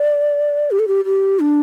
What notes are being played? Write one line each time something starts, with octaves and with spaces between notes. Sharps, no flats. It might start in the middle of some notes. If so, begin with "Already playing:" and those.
Already playing: D5
G4
A4
G4
G4
D4